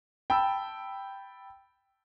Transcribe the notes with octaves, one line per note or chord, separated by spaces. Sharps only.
G5 A5 B5 E6